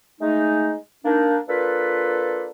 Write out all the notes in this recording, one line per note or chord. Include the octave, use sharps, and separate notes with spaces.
G#3 A3 D#4
A#3 D4 D#4
A#3 D4 F4 A4 B4